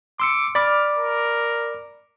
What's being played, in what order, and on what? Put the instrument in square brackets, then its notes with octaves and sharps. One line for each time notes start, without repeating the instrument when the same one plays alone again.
[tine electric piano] C6 E6 C#7 [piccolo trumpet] D6
[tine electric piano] D5 B5 D6 [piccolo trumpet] F6
[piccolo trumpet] A#4